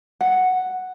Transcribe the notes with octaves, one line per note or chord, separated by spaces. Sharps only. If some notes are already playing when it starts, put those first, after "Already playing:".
F#5